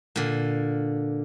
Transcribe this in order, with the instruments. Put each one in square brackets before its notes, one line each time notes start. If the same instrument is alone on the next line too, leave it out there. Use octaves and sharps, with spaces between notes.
[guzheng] A#2 D3